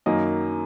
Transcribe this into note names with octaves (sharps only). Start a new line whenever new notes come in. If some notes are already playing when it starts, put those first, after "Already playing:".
F#2 D#3 F#3 A#3 D#5